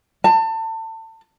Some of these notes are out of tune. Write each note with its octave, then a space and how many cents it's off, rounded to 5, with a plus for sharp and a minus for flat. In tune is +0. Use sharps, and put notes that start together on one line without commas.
A5 +30